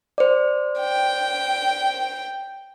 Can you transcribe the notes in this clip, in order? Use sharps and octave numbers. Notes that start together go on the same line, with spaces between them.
C5 D5
G5